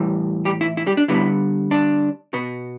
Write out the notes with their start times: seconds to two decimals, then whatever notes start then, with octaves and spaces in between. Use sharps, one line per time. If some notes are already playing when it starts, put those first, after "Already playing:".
Already playing: A2 E3 G3
0.45 G3 G4
0.61 E4
0.77 E4
0.87 G3 G4
0.97 D4
1.08 D3 G3 B3 E4
1.71 D4
2.33 B2 B3